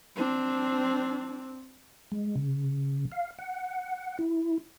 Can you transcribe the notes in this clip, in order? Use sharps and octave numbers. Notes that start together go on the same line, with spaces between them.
C4 D4
G#3
C#3
F5
F#5
E4